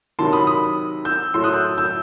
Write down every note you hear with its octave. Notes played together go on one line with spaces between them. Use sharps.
C3 D#3 F#3 A5 C6
B5 D#6
B5 D#6
E6 G6
A2 F#3 A3 C6 E6
D#6 F#6
E6 G6
E6 G6